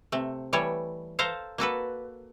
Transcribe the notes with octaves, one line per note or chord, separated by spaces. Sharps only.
C3 A3
E3 G3 A3 C#5
A4 C5 F5 A#5
A#3 F#4 A4 B4